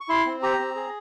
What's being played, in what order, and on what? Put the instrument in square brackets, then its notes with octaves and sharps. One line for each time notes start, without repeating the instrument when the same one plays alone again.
[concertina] C#6
E4 C6
C4
G4 A#5
C4
G#4